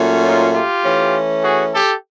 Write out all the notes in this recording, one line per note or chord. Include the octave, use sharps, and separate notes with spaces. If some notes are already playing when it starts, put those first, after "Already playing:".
Already playing: A#2 F#3 A3 C#4
D#4 F4
F4 G4
E3 A3 C#4
F#4 G#4
G4 A4